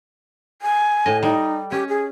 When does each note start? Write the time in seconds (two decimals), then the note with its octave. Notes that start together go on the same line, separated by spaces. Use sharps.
0.62 G#5
1.06 A2 D#5
1.23 G3 D#4
1.72 C#4 G4
1.89 G#4